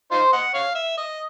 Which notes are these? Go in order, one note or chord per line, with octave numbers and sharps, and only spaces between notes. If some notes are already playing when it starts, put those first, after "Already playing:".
D#4 F4 C5
D#5 F#5
C#5 F5
E5
D#5